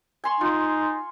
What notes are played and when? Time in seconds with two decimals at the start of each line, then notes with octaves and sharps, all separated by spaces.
0.24 G#5 C6 C#6
0.41 D#4 F4